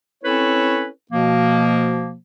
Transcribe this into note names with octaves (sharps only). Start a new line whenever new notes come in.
C4 C#4 E4 A4 B4 C#5
B2 F3 A#3